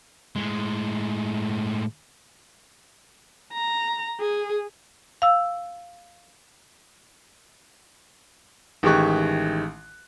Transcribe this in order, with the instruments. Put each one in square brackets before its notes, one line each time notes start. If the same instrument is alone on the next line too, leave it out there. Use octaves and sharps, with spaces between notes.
[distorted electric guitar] A2 G#3
[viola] A#5
G#4
[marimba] F5 E6
[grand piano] A1 D#3 G#3 G4 C#6 F#6